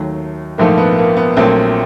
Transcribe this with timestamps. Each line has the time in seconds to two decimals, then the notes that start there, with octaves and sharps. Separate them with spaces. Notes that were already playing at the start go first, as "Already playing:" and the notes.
Already playing: D#2 D#3 F#3 A3
0.58 A#1 G#2 F3 A3 A#3
0.78 B3
0.98 A#3
1.17 B3
1.37 A#1 A#2 F#3 A3 A#3 C4